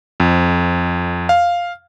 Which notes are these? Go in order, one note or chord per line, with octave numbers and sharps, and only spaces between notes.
F2
F5